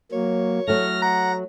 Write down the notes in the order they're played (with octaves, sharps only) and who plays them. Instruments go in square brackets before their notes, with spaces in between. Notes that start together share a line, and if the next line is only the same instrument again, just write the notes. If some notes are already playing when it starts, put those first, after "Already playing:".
[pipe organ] F#3 A#3 [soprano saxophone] C#5
[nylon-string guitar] F#3 A3 [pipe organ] F6 A#6
[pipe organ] F#5 [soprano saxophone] A#5